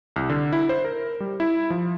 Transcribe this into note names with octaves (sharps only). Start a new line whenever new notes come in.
C2
D3
E4
C5
A#4
G3
E4
F3